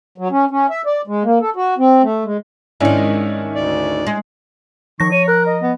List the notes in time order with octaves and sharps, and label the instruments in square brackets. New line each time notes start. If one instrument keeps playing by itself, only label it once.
[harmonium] F#3
C#4
C#4
E5
D5
G#3
A#3
A4
F#4
C4
A3
G#3
[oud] G#2 D#3 [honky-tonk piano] C#4 D4 E4
[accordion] D2 D5
[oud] G#3
[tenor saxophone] D#3 [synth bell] F3 A#6 [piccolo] C#6
[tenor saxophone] C#5 [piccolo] D#7
[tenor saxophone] A#4 [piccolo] F#6
[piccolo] D#5
[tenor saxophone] B3